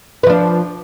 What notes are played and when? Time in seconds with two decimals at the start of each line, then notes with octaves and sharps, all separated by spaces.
0.23 B4
0.27 F3
0.30 D4